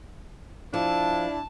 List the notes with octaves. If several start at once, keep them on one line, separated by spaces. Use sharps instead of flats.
F3 D4 E4 A5